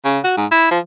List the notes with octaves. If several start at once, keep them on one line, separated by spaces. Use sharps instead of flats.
C#3
F#4
G#2
E4
F3